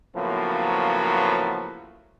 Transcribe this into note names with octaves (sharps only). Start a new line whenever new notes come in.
A2 C#3 F3 F#3 A#3 B3